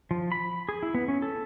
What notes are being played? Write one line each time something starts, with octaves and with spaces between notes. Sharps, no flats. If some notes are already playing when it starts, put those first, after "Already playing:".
F3
B5
G#4
E4
B3
C#4
A4